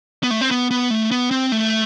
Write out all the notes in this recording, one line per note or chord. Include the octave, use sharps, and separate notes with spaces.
B3
A3
C4
B3
B3
A3
B3
C4
A3